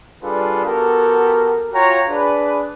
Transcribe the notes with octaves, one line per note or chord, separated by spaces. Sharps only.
G3 D4 F4 G#4 A4 B4
B3 F#4 G4 A4 A#4
F4 F#4 C#5 G5 A#5
D4 G#4 B4